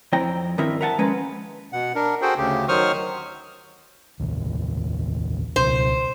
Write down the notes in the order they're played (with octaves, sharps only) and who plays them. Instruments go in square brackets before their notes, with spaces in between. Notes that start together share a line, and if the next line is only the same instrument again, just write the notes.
[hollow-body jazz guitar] F2 C4 E4 G5 A#5
G2 D#3 C4 E4 A#4 E5
A#4 E5 F#5 G#5 A5
F3 G#3 A#3 C#4 B4 A#5
[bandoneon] B2 F#5
D4 A#4
F#4 G#4 A4 C5 G5
D2 C#3 G4
D#3 F#3 C5 C#6 D#6 F6
[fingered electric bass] A1 D#2
[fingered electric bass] C#2 B2 [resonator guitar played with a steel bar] C5